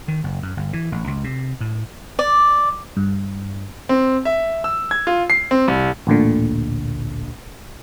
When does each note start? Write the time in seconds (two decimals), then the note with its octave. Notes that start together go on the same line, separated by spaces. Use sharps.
0.08 D#3
0.24 F#1
0.42 F#2
0.57 G1
0.73 E3
0.92 A1
1.07 C#2
1.24 C3
1.60 A2
2.19 D5
2.97 G2
3.89 C4
4.25 E5
4.64 E6
4.91 G#6
5.07 F4
5.30 C7
5.51 C4
5.68 C2
6.07 A1 D2 A#2 D3